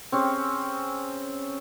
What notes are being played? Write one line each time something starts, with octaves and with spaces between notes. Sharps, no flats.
C4 C#4 G#4